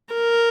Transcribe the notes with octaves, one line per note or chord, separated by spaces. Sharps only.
A#4